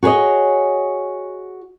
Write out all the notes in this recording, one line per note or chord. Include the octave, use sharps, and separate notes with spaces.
F#4 G#4 B4 C#5 D#5